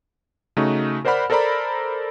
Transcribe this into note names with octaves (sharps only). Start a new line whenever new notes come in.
C#3 A3 D#4 F#4
A#4 C5 D5 F#5 B5 F6
A4 A#4 C5 D5 A#5 B5